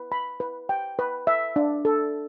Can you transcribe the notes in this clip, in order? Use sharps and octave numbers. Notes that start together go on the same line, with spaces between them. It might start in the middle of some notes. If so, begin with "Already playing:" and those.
Already playing: B4
B5
B4
G5
B4
E5
D4
A4